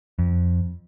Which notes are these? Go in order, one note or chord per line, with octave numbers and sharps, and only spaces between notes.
F2